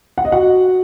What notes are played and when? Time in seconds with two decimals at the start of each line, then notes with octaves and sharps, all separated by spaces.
0.18 F#5
0.25 D#5
0.32 F#4 F#5